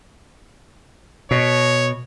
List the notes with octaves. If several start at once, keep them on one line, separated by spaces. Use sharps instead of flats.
B2 C#5